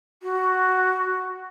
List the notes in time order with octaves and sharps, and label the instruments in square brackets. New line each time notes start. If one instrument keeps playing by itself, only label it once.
[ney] F#4